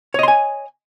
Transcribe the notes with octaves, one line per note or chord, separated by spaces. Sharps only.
C#5 D#5 G#5 C6